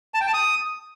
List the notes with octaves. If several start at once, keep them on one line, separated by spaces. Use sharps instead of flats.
A5
G5
A5
D#6